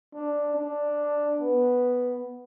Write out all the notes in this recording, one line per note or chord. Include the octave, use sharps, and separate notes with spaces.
D4
D4
B3